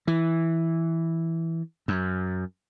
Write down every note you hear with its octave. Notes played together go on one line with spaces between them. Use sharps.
E3
F#2